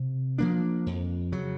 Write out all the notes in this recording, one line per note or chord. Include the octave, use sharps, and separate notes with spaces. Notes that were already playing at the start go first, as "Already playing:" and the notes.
Already playing: C3
F3 A#3 D4
F2
C#3 F#3